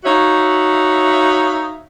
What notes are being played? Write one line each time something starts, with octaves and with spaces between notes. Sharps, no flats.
D#4 F#4 C#5 E5 F5